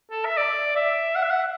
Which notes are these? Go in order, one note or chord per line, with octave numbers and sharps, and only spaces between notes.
A4
E5
D5
E5
F#5
E5
F#5